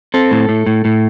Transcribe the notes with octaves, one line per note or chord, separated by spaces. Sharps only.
C4 A4
A2
A2
A2
A2